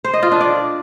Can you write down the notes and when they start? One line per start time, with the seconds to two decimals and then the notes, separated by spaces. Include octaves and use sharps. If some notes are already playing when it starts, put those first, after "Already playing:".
0.04 C5
0.14 D#5
0.23 F4
0.32 D4
0.41 D5